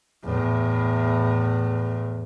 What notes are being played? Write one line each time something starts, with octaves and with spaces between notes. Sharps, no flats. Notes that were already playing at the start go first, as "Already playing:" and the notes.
E2 A2